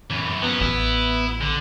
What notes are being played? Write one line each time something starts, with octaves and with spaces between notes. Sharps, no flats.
F#2 E3
F#3 B3 C#4
A1 E4
D3